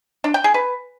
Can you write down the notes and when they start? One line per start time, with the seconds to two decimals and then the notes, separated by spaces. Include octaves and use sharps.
0.24 D4
0.34 G5
0.44 G#4
0.54 B4